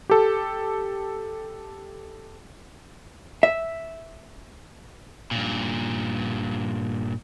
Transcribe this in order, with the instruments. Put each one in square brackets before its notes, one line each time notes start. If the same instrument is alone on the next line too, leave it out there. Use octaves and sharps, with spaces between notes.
[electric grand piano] G4 A4
[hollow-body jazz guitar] E5
[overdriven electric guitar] G2 A#2